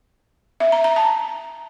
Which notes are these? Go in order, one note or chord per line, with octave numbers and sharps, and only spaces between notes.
E5
A#5
A#5
A5